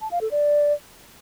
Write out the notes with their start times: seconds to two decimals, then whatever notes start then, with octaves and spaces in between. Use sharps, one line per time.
0.01 A5
0.11 F5
0.21 A4
0.31 D5